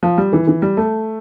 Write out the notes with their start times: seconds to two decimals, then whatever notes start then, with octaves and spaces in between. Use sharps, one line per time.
0.03 F3
0.18 G3
0.33 E3
0.47 E3
0.62 G3
0.77 A3